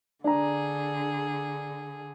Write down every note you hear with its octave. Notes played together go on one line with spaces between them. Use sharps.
D3 D4 G#4 A#5